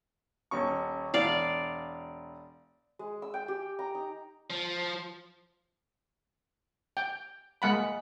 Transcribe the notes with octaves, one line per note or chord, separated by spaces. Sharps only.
D#1 C#4 C#6
E1 D5 F5
G#3
E6
G5
G4
A#5
D#4
F3
G5
G#3 A#3 F#5 B5